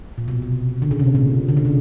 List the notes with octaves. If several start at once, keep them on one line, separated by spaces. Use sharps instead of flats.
A#2
B2
C3
D3
C#3
C3
B2
A#2
D3
C#3
C3